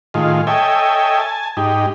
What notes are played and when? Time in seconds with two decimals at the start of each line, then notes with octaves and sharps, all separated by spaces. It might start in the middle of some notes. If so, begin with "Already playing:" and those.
0.14 A2 D#3 G#3 F4
0.47 A4 C#5 D#5 E5 G5 G#5
1.20 G#5 A5
1.57 G#2 D#4 G4